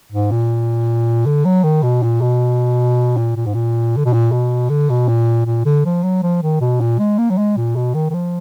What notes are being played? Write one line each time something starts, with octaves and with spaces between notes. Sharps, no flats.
G#2
A#2
D3
F#3
D#3
B2
A#2
B2
A#2
A#2
G#2
A#2
D3
B2
A#2
B2
D3
B2
A#2
A#2
D3
F3
F#3
F3
D#3
B2
A#2
G#3
A#3
F#3
G#3
A#2
B2
D#3
D#3
F3